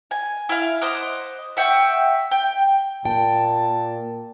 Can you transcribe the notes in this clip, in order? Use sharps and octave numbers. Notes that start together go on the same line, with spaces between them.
G#5
E4 F5
C5 D#5 F#5 D6
E5 F#5 G5 C#6
G5
A#2 G5 A5